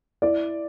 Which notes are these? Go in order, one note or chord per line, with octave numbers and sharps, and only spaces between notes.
E4 D5